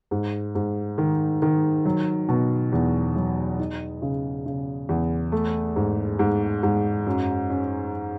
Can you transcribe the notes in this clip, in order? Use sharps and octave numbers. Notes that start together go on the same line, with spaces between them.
G#2
G#2
D#3
D#3
F#3
B2
E2
F#3
D#4
C#3
C#3
E2
A3
G#2
G#2
G#2
F#2
C#4